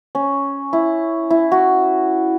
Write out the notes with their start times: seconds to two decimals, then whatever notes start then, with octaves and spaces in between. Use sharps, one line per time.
0.15 C#4
0.73 E4
1.30 E4
1.52 F#4